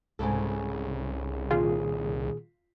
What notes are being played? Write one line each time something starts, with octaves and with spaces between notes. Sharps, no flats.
C2 G#2 C#3 A4
A#2 D#3 F4 G#4